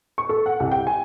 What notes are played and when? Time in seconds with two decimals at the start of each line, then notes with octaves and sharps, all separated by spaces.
0.18 C#6
0.29 A4
0.46 F#5
0.60 C2
0.72 G5
0.87 G#5